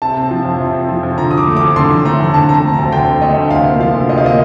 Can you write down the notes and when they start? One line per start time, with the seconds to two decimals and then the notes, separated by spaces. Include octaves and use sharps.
0.02 C3 A5
0.16 C4
0.31 F3
0.45 F2
0.60 C3
0.74 C4
0.89 F3
1.03 F2
1.18 D3 A#5
1.31 F2 D#6
1.38 D6
1.47 A3
1.57 F2 D6
1.76 D3 C6
1.91 F2
2.05 A3 A#5
2.20 F2
2.34 D3 A5
2.49 C4 A#5
2.54 A5
2.63 A3
2.73 A#5
2.78 D2
2.92 D3 G5
3.07 C4
3.22 A3 D#5
3.37 D2
3.51 C3 F5
3.65 A#3
3.80 F3 F5
3.94 D2
4.09 C3 D#5
4.18 F5
4.24 A#3 D#5